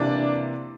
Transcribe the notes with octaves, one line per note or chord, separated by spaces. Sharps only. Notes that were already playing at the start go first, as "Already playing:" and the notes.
Already playing: C3 E3 A#3 D4 D5